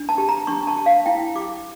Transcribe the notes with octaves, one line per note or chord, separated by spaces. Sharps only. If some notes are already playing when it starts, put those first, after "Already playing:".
Already playing: D4
A5
G4
A#5
D4 C#6
A5
G4
F5
E4 G5
G4 D6